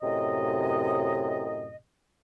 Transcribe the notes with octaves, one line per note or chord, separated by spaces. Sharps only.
F#2 A2 C3 D#5